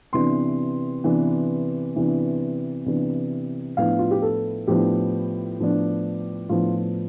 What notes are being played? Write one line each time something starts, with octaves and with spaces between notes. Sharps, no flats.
C3 E3 B3 D4 C6
C3 E3 B3 D4
C3 E3 B3 D4
C3 E3 B3 D4
A2 F3 B3 D4 F5
F4
G4
A4
A2 F3 B3 D4 G4
A2 F3 B3 D4
A2 F3 B3 D4 F4